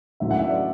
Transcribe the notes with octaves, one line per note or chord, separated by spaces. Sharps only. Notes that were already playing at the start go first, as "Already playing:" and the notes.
D2 D3 F#3 C#4 E4 E5
F#5
E5
D5